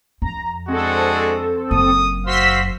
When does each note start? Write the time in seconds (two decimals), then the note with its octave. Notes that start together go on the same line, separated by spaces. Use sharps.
0.22 F2 A#5
0.68 G#3 C4 D4 F#4 A4
1.71 F#1 F#2 D#6
2.26 F#4 C5 F5 C6 E6 B6